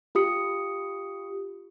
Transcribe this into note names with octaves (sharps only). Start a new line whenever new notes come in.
F4 G4 D#6 C#7